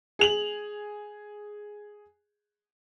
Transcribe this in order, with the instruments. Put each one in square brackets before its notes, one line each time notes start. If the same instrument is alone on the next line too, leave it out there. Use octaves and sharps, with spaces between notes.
[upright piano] G#4 F7 F#7